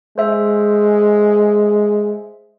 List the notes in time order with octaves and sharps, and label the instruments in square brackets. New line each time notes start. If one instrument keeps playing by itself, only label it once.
[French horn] G#3 [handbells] C5 E5